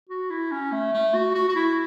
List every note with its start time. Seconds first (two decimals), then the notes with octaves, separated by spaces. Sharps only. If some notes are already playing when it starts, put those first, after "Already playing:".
0.09 F#4
0.30 E4
0.52 C#4
0.72 A3
0.94 A3
1.14 F#4
1.35 F#4
1.49 F#4
1.56 E4